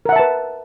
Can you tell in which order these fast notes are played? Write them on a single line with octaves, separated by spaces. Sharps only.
A#4 F#5 E5 A5 B4